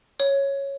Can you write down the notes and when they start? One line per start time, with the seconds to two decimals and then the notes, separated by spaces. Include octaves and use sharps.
0.20 C#5